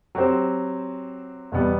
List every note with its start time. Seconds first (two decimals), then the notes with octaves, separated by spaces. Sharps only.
0.15 F#3 C4 G4 C5
1.52 E2 B2 G3 B3